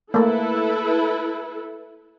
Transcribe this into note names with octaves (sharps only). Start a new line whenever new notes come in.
A3 A#3 E4 A4 B4